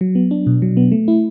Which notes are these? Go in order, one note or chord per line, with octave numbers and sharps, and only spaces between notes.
F#3
B3
D4
B2
F#3
B3
A3
E4